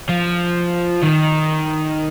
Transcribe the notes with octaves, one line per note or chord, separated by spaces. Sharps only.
F3
D#3